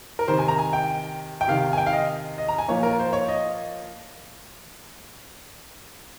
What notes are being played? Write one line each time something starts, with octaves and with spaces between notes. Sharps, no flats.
A#4
C3 D#3 C5
G#5
A#5
G#5
G5
G5
C3 D#3 F5
G#5
G5
F5
D#5
D#5
A#5
G#5
A#2 F3 C#5
A#4
C5
C#5
D#5